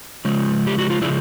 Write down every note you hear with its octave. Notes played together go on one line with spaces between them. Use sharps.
C#3 F3 G#3
G4
F#4
F4
C#3 F3 G#3 D4 E4